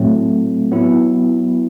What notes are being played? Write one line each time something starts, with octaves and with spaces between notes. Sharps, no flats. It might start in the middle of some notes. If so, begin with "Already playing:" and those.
Already playing: A2 F#3 A3 C4
F#3 B3 E4